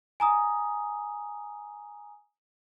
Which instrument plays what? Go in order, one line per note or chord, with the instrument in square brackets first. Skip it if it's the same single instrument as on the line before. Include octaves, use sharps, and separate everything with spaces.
[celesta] G#5 A#5 D#6